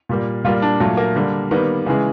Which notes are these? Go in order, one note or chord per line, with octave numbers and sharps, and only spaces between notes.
A#2 G3 A#3
A#2 G3 A#3 F4
D4
A#2 F#3 A3
A#3
D3 G3 A#3
D#3 G3 A#3 B3
C#3 E3 G#3